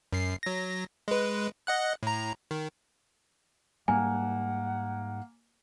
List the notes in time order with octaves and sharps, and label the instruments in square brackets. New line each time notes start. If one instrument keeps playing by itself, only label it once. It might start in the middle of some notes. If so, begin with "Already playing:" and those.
[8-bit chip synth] F#2 C7
F#3 A#6
G#3 B4
D#5 F#5 F#6
A2 A#5
D#3
[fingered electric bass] G#2 G3 [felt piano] A#3 [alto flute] F#5 [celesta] G#5